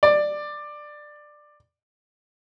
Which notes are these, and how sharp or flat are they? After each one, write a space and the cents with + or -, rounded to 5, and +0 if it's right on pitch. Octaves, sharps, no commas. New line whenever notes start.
D5 +15